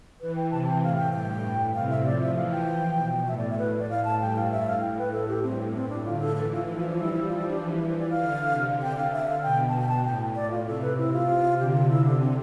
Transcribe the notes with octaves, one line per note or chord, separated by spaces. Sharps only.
E3 B4
G5
C3 A5
G5
A2 F5
G5
G2 G5
A2
C3 F5
E5
F3 D5
E5
E3 F5
G5
B2
A2 E5
D5
E5
B4
D5
F5
A5
G2 G5
F5
A2 E5
F5
G5
B4
A4
G4
G2 C4
A2 C4
D4
D3 F4
A4
E3 A4
F4
F3 E4
F4
D4
G3 E4
E4
F3 F4
E4
D4
E3
E4
E3 C5
D5
F5
D3
C3
D3 G5
F5
D3 E5
F5
B2 G5
A5
G5
A5
A2 G5
A2 D5
F4
C3 A4
B4
C3 E4
F4
C3
D3 G4
E4
F4
E4
D4
C4